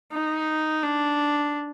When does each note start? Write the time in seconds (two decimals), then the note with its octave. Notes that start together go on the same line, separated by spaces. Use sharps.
0.12 D#4
0.83 D4